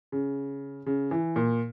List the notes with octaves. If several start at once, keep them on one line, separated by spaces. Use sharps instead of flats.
C#3
C#3
E3
A#2